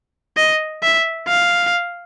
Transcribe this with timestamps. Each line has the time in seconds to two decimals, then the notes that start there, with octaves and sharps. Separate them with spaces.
0.37 D#5
0.83 E5
1.28 F5